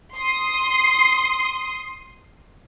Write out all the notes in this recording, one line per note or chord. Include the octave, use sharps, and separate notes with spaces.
C6 D#6 C7